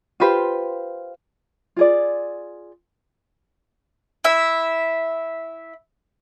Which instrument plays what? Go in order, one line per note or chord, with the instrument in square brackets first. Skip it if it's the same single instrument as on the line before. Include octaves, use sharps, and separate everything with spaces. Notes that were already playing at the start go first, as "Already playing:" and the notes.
[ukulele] F4 G4 B4 C5
F4 G#4 D5
[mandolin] E4 E5